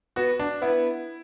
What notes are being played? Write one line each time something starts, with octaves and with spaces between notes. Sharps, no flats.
B3 F#4
D4
B3 E4